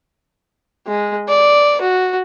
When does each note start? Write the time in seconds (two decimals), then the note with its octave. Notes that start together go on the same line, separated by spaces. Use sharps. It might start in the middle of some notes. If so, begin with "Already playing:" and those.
0.87 G#3
1.28 D5
1.81 F#4